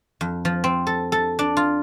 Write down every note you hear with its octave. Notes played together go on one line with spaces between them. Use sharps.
F2
F3
C4
A4
A4
D4
F4